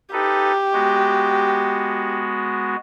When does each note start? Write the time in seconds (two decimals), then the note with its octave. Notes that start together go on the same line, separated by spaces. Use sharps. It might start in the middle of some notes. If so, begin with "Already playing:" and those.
0.13 D#4 G4 A4 B4
0.73 G#3 B3 F#4